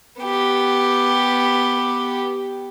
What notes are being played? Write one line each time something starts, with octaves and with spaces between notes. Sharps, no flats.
B3 G4